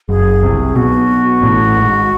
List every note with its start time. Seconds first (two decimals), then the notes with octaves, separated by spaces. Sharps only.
0.09 F#1 F#2 G#4
0.42 C2 C3
0.75 B1 B2 F#4
1.42 A1 A2
1.76 G#1 G#2